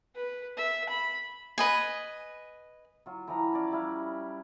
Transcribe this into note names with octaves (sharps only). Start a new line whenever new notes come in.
B4
E5
B5
B4 D#5 G#5
F#3 F4
E3 F3 A#5
C#4 D5
G3 E4 F5